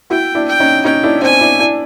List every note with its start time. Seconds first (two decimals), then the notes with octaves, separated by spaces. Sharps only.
0.10 E4 F#4 G5
0.35 D4 E4
0.48 G5
0.60 C#4 D#4
0.85 C#4 D#4 G5
1.03 D4 E4
1.22 C4 D4 G#5
1.41 D4 E4
1.59 D4 E4